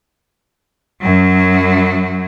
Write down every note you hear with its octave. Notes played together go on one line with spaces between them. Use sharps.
F#2 F#3